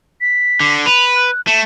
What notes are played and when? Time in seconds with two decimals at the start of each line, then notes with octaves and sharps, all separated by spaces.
0.21 B6
0.60 D3
0.86 B4 F7
1.15 F#6
1.47 A3 E7